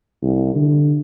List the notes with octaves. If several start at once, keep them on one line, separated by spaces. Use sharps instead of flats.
C2
D3